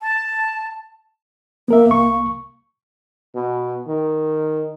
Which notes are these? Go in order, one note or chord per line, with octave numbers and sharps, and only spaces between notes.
A5
A#3 B3 A#4 E5
C2 C#6
B2
D#3